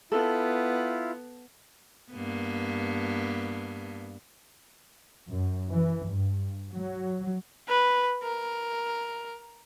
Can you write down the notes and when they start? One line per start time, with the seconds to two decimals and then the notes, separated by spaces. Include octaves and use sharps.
0.12 B3 E4 F4 A4
2.13 G2 A#3 B3
5.28 F#2
5.69 E3
6.07 G2
6.72 F#3
7.68 B4
8.23 A#4